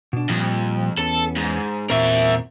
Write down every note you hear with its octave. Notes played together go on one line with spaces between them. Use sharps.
B2 D4
F2 A#2 F3 G3
E2 B3 C#4 A4
G#2
E2 A#2 C4 A#4 E5